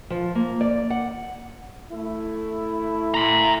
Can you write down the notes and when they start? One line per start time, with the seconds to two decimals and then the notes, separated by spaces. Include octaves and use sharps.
0.10 F3
0.35 A#3
0.61 D5
0.90 F#5
1.92 A3 E4
3.14 A#5 C6